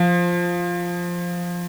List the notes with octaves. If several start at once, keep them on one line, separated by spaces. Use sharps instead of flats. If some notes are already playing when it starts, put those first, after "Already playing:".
Already playing: F3